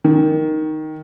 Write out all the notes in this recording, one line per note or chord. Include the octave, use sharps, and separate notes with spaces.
D#3